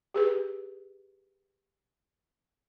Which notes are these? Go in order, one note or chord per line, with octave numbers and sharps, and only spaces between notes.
G4 G#4 B4